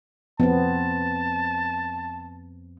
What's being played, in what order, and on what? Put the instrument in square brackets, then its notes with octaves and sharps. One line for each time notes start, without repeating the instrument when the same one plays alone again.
[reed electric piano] F2 [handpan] B3 C4 [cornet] A5